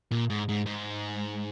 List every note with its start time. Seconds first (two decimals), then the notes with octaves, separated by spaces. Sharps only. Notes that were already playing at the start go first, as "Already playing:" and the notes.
0.11 A#2
0.30 G#2
0.49 G#2
0.66 G#2